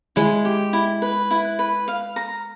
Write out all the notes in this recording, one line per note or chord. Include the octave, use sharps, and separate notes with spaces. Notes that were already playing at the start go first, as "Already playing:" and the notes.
G#3 E4
G4
E4
B4
E4
B4
F5
A#5